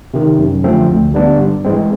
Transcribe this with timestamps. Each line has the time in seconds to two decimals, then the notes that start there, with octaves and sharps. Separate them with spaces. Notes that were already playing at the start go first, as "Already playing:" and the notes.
0.14 C3 D#3
0.39 F#2
0.64 D3 F3 A3 C4
0.89 D2
1.14 D3 G3 B3 D4
1.39 G2
1.64 E3 G#3 C4